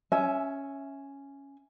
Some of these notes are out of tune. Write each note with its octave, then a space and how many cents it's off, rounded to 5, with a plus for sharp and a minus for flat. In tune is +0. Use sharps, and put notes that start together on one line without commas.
C#4 +0 E5 +0 G#5 +40